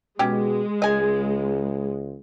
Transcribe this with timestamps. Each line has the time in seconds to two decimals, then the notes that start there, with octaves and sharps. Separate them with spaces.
0.19 B2 G#3 C#4 G4
0.82 C#2 D#5 G#5